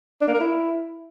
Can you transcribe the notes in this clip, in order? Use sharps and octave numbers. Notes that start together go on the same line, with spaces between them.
D4
A#3
A#4
E4